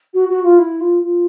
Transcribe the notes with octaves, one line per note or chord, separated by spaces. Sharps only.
F#4
F#4
F4
E4
F4
F4